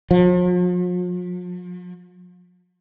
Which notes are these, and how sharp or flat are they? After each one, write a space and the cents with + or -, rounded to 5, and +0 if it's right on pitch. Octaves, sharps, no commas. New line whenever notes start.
F3 +45